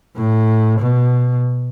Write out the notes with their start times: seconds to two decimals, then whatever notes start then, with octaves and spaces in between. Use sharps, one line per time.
0.16 A2
0.79 B2